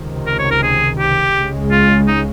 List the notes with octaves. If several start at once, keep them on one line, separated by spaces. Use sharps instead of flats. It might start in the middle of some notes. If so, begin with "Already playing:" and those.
Already playing: C#2 C3 D#3
A#4
C#5
A#4
G#4
G4
C#2 C#3 G#3
F4
D#4